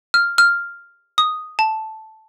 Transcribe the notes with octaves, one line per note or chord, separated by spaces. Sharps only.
F6
F6
D#6
A5